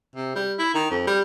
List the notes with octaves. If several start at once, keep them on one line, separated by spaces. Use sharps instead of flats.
C3
G3
E4
D#3
F2
G3